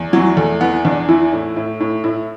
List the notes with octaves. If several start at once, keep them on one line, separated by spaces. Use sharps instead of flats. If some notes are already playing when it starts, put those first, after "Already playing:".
Already playing: E2
E3 F#3
E2 A3
E3 B3
E2 D4
E3 E4
A2
A2
A2
A2 E4